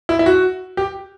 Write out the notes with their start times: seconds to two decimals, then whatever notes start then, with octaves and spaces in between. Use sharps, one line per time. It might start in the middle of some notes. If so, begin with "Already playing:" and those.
0.09 E4
0.19 E4
0.26 F#4
0.77 G4